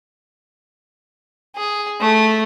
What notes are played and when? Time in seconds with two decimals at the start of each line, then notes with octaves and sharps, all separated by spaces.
1.56 G#4
2.00 A3